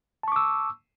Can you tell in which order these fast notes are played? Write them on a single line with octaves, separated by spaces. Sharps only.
A5 C#6 D6 E6